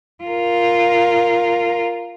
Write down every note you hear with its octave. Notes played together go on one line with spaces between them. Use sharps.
F4 A#4